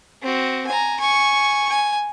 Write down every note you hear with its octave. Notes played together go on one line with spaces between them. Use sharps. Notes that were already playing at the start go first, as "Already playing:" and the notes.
C4 F#4
G#5 A#5
G#5 C#6
G#5